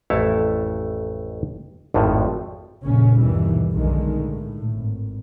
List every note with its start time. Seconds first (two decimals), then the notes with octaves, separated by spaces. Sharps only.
0.10 A1 F2 A3 E4 C#5 A5
1.94 G#1 F2 A2 F3
2.84 F1 A#1 C#3 C#4
3.19 G1 D#2 B2 E3 G3
3.73 B1 F#2 D3 D#3 G#3
4.20 A2
4.73 G#1